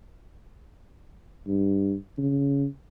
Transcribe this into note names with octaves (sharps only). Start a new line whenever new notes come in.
G2
C#3